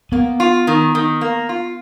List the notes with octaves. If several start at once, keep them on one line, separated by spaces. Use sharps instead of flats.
A#3 B3
F4
D#3
D#3
A#3
F4